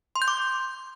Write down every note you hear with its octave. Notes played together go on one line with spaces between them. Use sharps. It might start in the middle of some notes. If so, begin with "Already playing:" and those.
C6
G6
D6